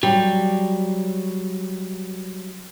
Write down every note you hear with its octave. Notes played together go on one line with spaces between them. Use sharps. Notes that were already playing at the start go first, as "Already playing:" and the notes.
F#3 G3